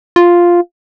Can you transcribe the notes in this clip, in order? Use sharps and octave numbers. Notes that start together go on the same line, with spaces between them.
F4